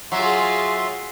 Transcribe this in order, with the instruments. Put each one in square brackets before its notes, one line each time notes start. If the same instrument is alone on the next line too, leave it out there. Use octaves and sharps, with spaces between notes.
[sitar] F#3 [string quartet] F4 G#4 [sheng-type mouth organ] E5 C6